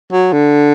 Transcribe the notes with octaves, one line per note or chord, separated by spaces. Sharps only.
F#3
D3